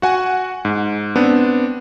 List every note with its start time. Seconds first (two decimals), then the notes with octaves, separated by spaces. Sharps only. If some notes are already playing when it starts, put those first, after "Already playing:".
0.02 F#4 F#5 G#5
0.65 G#2
1.16 B3 C4 D4